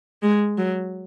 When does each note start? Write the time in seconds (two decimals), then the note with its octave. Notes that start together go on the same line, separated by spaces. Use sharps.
0.22 G#3
0.58 F#3